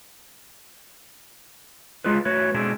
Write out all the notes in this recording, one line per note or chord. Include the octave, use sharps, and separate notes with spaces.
G#3 F4 G#4 B4
A3 F#4 B4 C#5
B2 G#3 A3 C4 D4 G#4